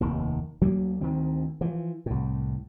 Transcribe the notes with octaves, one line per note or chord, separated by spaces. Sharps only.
F1 D#2 D#3
D2 F#3 A#3
D2 D#3 C4
E3 F3
C2 A2